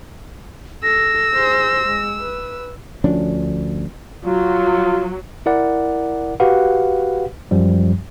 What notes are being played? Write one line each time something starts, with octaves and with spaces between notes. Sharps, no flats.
A4 E6 A#6
G#4 C5
G#3
B4
D2 F3 C#4 D4
F#3 F4
E4 A#4 D5 F#5
F#4 G4 B4 F5 F#5
F#2 F3 G3